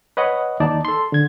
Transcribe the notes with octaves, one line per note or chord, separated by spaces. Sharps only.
B4 C#5 D#5 F#5
D#2 D#4 D5 A5
A4 C6
D3 G#6